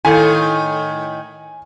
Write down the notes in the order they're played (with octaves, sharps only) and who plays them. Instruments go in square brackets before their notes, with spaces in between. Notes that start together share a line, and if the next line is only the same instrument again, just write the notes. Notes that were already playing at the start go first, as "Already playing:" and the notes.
[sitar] A2 D#3 [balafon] E4 A4 F5 [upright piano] G#5